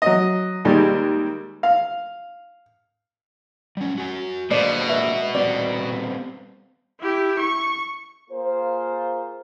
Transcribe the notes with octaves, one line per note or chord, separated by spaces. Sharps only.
F#3 D#5
D#2 G3 G#3
F5
G3 C#4
F#4 G#5
B2 G#3 A#3 D4 C5 D5
B4 E5
G3 B3 C4 D5
E4 G4
C#6
A#3 F4 G#4 A#4 C5